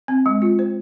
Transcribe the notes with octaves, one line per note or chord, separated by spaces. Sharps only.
C4
G#3
F4
C5